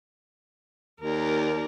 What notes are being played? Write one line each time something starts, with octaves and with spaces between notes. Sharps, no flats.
D#2 A#4 D5